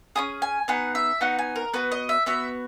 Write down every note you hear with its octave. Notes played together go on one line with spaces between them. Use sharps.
C#4 E4 G#4 D#6
G#5
B3 D#4 G#4 F#5
E5
B3 D#4 F#4 F#5
G#5
A#4
B3 F#4 B4
D#5
E5
B3 F#4 E5